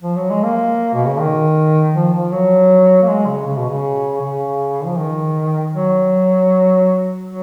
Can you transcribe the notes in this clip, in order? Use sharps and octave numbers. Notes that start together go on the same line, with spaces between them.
F3
F#3
G#3
A#3
B2
C#3
D#3
F3
F3
F#3
A#3
G#3
C#3
C#3
B2
C#3
C#3
F3
D#3
F#3
F#3